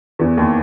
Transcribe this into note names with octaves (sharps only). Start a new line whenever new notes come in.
E2 E3
D#2 D#3